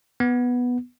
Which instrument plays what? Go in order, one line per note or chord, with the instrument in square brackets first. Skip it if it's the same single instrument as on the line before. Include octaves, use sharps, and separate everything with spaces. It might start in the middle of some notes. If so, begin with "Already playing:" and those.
[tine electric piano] B3